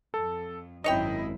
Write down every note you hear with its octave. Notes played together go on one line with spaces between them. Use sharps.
F2 A4
G#1 F#2 C4 D#4 E4 C#5 D#5 G5